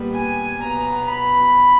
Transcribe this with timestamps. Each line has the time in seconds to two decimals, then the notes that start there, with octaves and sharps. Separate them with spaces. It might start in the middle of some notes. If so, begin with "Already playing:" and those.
Already playing: A#2 G3 B3
0.13 G#5
0.62 B2 F#3 B3 A#5
1.10 B5